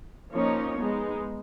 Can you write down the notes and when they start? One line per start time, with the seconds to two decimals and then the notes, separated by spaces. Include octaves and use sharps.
0.32 F3 A#3 C#4 D#4 C#5
0.78 G#3 B3 D#4